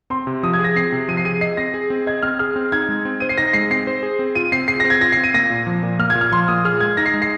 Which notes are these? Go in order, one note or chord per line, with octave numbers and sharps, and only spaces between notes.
C4 C6
C3
F3 D#6
G#6
G#4
A#6
C4 C7
C3
F3 D#7
C7
G#4 D#7
D#5 C7
C4 A#6
G#4
C4
D#5 G#6
C4 F6
G#4 F6
C4
D#4 G#6
G#3
C4
C5 D#7
C7
D#4 A#6
G#3 C7
C4 C7
C5
G#4
C4
F4 D#7
C4 C7
G#4 C7
A#6
C4
G#6
F4 A#6
C7
C4
D#7
A#3 A#6
A#2
F3
A#2
A#3 F6
G#6
A#2
F6
F3 C6
A#2 D#6
G#4 F6
G#3 G#6
D#4 A#6
C7
G#3
C7